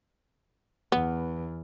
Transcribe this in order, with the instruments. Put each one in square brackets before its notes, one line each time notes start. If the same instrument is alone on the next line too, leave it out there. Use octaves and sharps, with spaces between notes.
[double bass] E2 [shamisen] B3